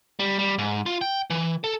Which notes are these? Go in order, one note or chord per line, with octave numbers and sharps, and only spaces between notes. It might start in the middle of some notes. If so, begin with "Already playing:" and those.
G3
G3
G#2
F4
G5
E3
A4